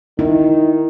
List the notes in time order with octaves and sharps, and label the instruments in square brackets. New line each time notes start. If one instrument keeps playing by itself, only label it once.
[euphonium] D#3 [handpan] E4